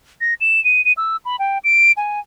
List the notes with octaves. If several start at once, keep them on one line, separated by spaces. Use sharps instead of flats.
A#6
E7
D#7
D#7
E6
B5
G5
D7
G#5